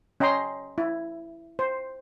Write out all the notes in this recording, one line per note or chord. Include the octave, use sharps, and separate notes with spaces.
C#4 D#5 G5 A#5 C6
E4
C5